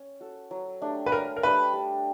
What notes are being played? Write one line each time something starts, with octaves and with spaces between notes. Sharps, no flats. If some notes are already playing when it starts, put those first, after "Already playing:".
Already playing: C#4
F#4 A4
F#3
A3 D4 G4
B4
F#3 A#4
A#4
A3 D4 G4 B4
G3